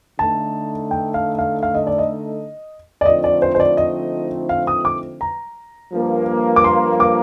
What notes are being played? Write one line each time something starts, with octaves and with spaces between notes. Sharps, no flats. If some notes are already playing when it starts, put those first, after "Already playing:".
D3 A3 D#4 A4 A5
G5
F5
F5
F5
D#5
D5
D#5
D5
D3 F3 A3 C4 D#4 D#5
D5
C5
C5
D5
D#5
F5
D#6
D6
A#5
G2 F3 A#3
D6
C6
D6